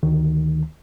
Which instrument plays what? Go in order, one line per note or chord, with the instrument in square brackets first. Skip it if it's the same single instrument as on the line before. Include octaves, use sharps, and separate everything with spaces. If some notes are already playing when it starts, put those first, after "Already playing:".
[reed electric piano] D2 D#3